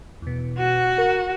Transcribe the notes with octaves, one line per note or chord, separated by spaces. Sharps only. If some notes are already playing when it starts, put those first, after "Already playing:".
E2 B2
F#4
A#4